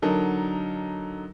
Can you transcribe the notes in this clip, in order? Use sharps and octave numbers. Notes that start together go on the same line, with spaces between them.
D3 F#3 D#4 A4 A#4